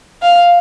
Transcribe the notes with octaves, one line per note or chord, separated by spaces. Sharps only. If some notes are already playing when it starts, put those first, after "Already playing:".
F5